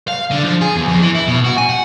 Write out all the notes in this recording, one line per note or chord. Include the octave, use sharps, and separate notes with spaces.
F5
D3
F3
G#4
E2
F2
E3
E4
B2
F#4
G#5
F#5